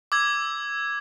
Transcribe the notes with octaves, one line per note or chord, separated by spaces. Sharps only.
D6 E6 G#6